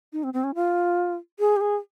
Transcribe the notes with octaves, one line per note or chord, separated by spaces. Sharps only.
D#4
C4
C4
C#4
F4
G#4
G4
G#4